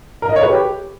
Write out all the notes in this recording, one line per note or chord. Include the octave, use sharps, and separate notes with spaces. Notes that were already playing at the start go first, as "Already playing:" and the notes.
A#4
D#5
C#5
B4
G4